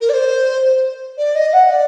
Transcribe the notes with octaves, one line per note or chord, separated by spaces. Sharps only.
A#4
D5
C5
D5
D#5
F#5
D5